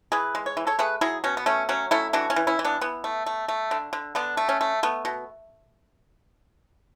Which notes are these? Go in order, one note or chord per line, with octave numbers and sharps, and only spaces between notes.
E3 G#4 B4
G#3
C#5
E3
A4 C#5
A3 G#4 B4
F#3 E4 G#4
B2 C#4
B3
A3 C#4
F#3 C#4
A3 C#4 E4
E3 D4 F#4
C#4 E4
E3
C#4 E4
E3
B3 D4
E3 B3
A3
A3
A3
D3
D3
D3 B3 D4
A3
C#4
A3
A3 B3
B2